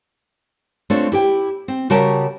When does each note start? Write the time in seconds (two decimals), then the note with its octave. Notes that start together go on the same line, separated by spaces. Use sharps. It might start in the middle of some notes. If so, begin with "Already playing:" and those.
0.90 A3 C4 D4 F4 C#5
1.12 E4 G4 G5
1.68 C4
1.90 C#3 G3 F#4 A#4 C#5 A5